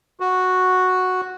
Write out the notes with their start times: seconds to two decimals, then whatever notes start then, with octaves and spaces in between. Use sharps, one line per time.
0.20 F#4